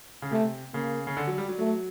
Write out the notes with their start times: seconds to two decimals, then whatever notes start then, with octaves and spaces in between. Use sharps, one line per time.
0.22 C#3
0.31 C3 A3
0.74 C#3 A#3
1.07 C#3
1.17 D3
1.27 F#3
1.38 G3
1.49 F#3
1.59 F#3 A3